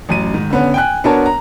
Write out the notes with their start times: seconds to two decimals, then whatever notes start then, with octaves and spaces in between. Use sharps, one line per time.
0.09 A1 F#2 D#7
0.34 G#2 D#3
0.50 D3 B3 C#4
0.74 G5 G#5 F#6
1.04 B3 D4 F#4 A#4 C#5 A5
1.26 A#5